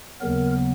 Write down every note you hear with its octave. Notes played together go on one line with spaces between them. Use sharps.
D#2 C#3 F#3 B3 A#4